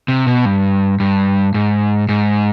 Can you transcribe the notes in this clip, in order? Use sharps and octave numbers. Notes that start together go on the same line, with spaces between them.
C3
B2
G2
G2
G#2
G#2